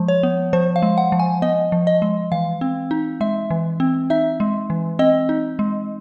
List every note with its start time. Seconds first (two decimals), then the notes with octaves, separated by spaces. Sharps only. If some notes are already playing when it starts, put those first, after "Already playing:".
Already playing: F3 G#3
0.08 C#5
0.23 B3
0.53 F3 C5
0.76 F5
0.82 G#3
0.98 F#5
1.12 F3
1.20 G#5
1.42 B3 D#5
1.72 F3
1.87 D#5
2.02 G#3
2.32 E3 F5
2.61 C4
2.91 D#4
3.21 G#3 E5
3.50 E3
3.80 C4
4.10 D#4 E5
4.40 G#3
4.70 E3
4.99 C4 D#5
5.29 D#4
5.59 G#3